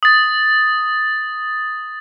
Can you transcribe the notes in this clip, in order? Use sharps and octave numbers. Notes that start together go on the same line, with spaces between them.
D#6 A6